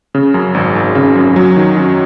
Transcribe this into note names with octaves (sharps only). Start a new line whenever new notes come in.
C#3
F#2
G#1
G#1
C#3
F#2
F#3
D#3
F#2